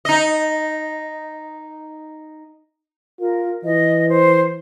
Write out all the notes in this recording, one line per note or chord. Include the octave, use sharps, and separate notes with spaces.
D#4 D#5
F4 A#4
E3 D#5
C5